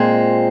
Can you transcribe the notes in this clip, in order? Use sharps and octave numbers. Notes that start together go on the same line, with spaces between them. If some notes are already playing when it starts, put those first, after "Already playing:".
Already playing: A#2 G#3 C4